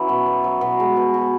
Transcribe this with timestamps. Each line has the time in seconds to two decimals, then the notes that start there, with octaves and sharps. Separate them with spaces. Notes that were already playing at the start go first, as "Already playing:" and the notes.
Already playing: E3 F#3 C#4 F#4
0.09 B2
0.26 B3
0.44 F#3
0.61 B2
0.80 G#3
0.97 B2
1.14 F#4